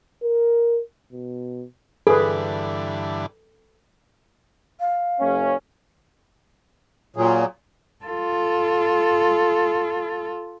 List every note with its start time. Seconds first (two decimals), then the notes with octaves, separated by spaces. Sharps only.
0.23 A#4
1.13 B2
2.07 G2 D3 E3 G#4 A4 B4
4.80 F5
5.20 F#1 C#4
7.16 A#2 F#3 G#4
8.05 F4 A4